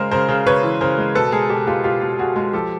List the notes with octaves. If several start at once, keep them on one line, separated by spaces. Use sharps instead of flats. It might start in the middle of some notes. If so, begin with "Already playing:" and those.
Already playing: C#3 G#3 A#4 C5
C#3 A#4 C5
C#3
C#3 B4 C#5
E3
C#3 A#4 C5
G#3
B2 A4 B4
G#3 G#4 A#4
B2 G4 A4
G#3 F4 G4
B2 F4 G4
B2
B2 F#4 G#4
G#3
F3 G4 A4